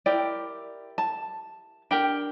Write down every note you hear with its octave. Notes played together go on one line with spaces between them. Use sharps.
E4 G4 A#4 D5
A5
D4 G4 A#4 G5